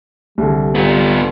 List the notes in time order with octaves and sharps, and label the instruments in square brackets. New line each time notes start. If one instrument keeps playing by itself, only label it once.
[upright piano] C2 D3 [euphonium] G3
[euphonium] G3 [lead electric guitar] B3 F4